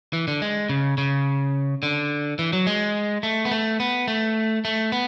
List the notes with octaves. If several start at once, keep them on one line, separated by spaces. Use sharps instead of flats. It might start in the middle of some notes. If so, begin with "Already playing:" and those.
E3
D3
G#3
C#3
C#3
D3
E3
F#3
G#3
A3
B3
A3
B3
A3
A3
B3